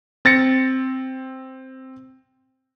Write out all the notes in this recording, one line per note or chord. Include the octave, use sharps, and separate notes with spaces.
C4 A6 A#6 C#7